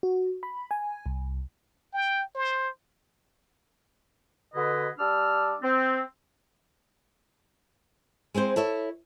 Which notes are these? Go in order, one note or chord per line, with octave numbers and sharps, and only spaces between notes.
F#4
B5
G#5
C2
G5
C5
B2 D3 G#4 B4 D#5
G3 D4 D5 E6 F6
C4
G#3 C4 E4 C5
E4 A4 C#5 E5